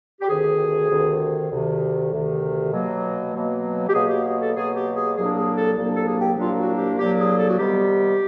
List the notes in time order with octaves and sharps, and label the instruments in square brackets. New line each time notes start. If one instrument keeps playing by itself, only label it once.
[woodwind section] G4
D2 C3 D#3 G#4
D2 C3 D#3
D2 C3 D#3
D2 C3 D#3
B2 F#3 A#3
B2 F#3 A#3
G4
B2 F#3 A#3 G#4
G4
G#4
A4
B2 F#3 A#3 G#4
G4
G#4
C2 A#2 F#3 A#3 D4 G#4
G#4
A4
C2 A#2 F#3 A#3 D4
A4
G#4
G4
C2 A#2 F#3 A#3 D4 F4
F#4
G4
C2 A#2 F#3 A#3 D4 G4
G#4
A4
F#4
C3 D#3 G3 B3 G4